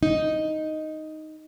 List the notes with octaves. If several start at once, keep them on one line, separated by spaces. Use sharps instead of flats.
D#4